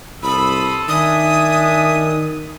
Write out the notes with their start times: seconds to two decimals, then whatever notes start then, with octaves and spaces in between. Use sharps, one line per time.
0.23 C2 A4 B5 C6 D#6
0.88 D#3 D4 E5 G#5 D#6